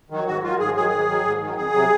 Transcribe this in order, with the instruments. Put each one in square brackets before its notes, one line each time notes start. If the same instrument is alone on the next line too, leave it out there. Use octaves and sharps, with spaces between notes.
[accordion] D#3 F#3
G#2 F#4
D#3 F#3 F4
G#2 G#4
D#3 F#3 G#4
G#2
D#3 F#3
G#2
D#3 F#3
F2 G#4
C3 F#3